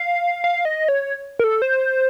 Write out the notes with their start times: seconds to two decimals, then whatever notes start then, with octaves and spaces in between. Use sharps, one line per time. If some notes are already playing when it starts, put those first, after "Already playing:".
Already playing: F5
0.44 F5
0.65 D#5
0.88 C#5
1.39 A#4
1.44 A4
1.62 C5